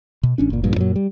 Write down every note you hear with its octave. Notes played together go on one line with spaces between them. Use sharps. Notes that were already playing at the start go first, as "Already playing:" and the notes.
B2
A1 C#4 D4
F#1 A#2
A#1 G2 A#2
F#2 A#2 F#3
G3